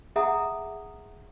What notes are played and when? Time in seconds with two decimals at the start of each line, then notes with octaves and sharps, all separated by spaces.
0.16 G#4 A4 E5 F#5 A#5 D#6